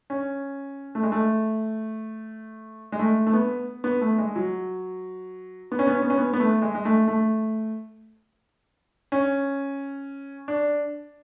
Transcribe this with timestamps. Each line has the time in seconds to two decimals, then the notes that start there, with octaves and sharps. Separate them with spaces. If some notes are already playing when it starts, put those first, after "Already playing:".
0.10 C#4
0.95 A3
1.03 G#3
1.12 A3
2.92 G#3
2.99 A3
3.27 A3
3.33 B3
3.84 B3
4.01 A3
4.18 G#3
4.35 F#3
5.72 B3
5.79 C#4
5.87 B3
5.94 C#4
6.02 B3
6.10 C#4
6.17 B3
6.33 B3
6.40 A3
6.62 G#3
6.75 G#3
6.85 A3
7.08 A3
9.12 C#4
10.48 D4